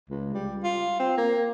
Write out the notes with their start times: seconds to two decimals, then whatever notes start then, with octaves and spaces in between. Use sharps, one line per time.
0.10 C#2
0.34 G3
0.64 F4
1.00 C4
1.18 A#3